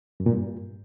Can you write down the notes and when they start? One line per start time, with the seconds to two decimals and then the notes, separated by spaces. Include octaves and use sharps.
0.20 F#2
0.26 A#2
0.32 G2